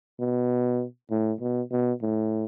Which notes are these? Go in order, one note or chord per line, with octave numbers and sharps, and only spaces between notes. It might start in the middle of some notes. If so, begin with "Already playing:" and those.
B2
A2
B2
B2
A2